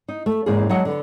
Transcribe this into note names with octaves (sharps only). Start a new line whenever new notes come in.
D#4
A3
E2 G#2 C#3 A#3 G#4
F#3 G#3 F#4 D#5 F#5 A5
D3 B3